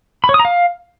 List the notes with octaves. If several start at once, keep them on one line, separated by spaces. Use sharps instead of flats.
B5
C#5
D#6
A#5
F5